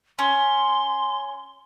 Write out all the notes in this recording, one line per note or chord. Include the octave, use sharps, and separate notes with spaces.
C#4 C6